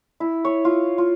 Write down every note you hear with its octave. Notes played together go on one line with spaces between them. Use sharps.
E4
C#5
F4
F4